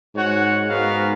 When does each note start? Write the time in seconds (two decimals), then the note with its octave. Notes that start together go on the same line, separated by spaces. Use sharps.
0.15 G#2 F#4 C#5 F#5
0.69 G#2 B3 F#4 A#4 F5